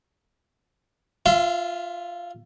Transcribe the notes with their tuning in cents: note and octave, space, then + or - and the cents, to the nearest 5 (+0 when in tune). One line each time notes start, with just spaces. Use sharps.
F4 +0 E5 +30 C6 -25